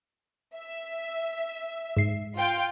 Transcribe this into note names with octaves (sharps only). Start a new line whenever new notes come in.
E5
G#2 C7
F4 F5 G5